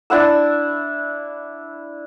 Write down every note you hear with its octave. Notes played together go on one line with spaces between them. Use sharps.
D4 E4 F#5 E6